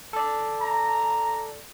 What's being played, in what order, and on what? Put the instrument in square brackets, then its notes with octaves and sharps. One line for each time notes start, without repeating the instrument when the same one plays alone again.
[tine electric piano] A4 D5
[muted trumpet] A#5